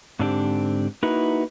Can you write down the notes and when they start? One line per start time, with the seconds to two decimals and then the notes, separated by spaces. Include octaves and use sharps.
0.19 G#2 D3 C4 D4 E4 G4
1.03 A#3 D#4 E4 F#4 B4